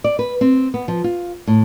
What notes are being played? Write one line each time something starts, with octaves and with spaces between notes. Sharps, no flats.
D5
B4
C4
B3
F3
F4
A2